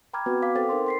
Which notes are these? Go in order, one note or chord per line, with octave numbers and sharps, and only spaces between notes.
G5 A#5 B5 D6 F6 G#6
B3 C4 F#4 B4
F5 D6 B6
C4 A4 C5 G5 A6
D#4 A#4 C5 C6
C6 B6 C7